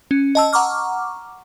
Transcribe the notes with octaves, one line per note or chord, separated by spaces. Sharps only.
C#4
D#5 A5 E6
F#5 A#5 C#6 D6 F6